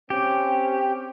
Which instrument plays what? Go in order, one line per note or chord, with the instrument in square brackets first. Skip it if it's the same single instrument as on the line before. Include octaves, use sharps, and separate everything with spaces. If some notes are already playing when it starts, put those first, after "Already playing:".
[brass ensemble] C4 C#4 [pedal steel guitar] G4